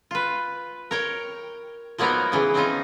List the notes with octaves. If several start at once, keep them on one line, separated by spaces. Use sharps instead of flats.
F4 B4
A#4 C#5 G5
F3 F#3 A#3 B3 D#4 A#4
C#3 E3 B3
F3 C4 C#4 D#4 F4